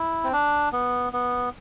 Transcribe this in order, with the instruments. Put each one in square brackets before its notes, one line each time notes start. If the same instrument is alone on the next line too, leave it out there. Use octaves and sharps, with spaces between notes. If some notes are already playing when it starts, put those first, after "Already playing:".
Already playing: [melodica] E4
C4
D4
B3
B3